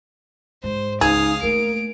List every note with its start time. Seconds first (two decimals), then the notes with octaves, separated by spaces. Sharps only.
0.64 G#2 C5
1.01 C#2 D#4 G#4 F5 D#6
1.42 A3 A#3 A#4 D7